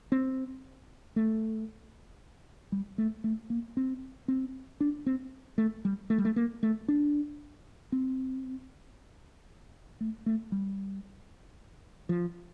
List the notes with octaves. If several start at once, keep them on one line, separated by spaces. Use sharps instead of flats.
C4
A3
G3
A3
A3
A#3
C4
C4
D4
C4
A3
G3
A3
G3
A3
A#3
A3
D4
C4
A3
A3
G3
F3